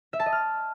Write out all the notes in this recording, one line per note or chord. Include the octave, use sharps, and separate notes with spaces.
E5
A5
D#5
F6